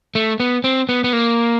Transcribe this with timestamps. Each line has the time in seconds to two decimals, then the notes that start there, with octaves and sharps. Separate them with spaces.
0.15 A3
0.40 B3
0.64 C4
0.89 B3
1.04 B3
1.13 A#3